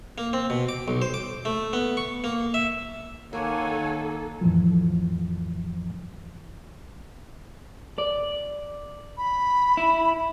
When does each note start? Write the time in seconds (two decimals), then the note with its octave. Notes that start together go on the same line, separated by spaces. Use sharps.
0.18 A#3
0.33 C4
0.50 B2
0.69 D6
0.88 B1
1.02 C5
1.14 D6
1.45 A3
1.73 B3
1.97 C#6
2.24 A#3
2.54 E5
3.33 D#3 A#3 A4 C#5 F#5 G#5
4.41 F2 A2 E3 F3
7.98 D5
9.18 B5
9.77 E4